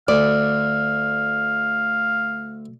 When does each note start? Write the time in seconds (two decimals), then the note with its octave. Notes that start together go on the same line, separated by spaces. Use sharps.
0.08 D2 D5 F5